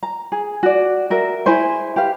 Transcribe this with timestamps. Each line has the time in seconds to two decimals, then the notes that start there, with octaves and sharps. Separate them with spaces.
0.03 A#5
0.32 G#4
0.63 F#4 D5
1.10 F#4 A#4 E5
1.46 E4 G#4 C5 G#5
1.96 G4 B4 F5